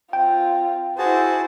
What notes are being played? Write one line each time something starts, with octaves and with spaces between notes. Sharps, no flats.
C4 F4 G5
E4 F#4 G#4 C5 A5